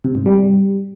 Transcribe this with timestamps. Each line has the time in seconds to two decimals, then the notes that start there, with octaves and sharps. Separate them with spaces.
0.04 C3
0.15 G#2
0.26 G3